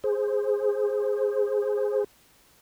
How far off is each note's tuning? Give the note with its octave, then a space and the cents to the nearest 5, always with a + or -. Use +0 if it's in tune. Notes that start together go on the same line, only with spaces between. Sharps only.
G#4 +0 C5 +5